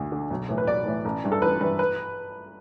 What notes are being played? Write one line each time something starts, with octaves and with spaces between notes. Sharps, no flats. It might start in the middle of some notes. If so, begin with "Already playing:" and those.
Already playing: D2 D3
D3
B1
A2 E3
B4
B1 D5
A2 E3
A1
G2 E3
A4
A1 B4
G2 E3 B4
B4